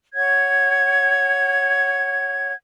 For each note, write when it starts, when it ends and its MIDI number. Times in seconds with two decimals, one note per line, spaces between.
0.13 2.53 73
0.13 2.53 78
0.13 2.53 92